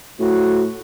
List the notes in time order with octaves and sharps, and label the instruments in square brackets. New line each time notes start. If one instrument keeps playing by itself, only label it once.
[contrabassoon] A2 [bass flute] F#4